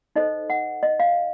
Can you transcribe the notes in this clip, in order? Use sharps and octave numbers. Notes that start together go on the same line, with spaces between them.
D#4 A4 C5 D#5
F#5
D#5
F5